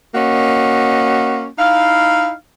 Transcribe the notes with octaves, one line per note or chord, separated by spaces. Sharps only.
A#3 C#4 F#4 D#5
D#4 E4 F5